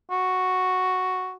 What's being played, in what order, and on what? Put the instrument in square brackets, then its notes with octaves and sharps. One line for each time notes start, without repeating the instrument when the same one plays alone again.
[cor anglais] F#4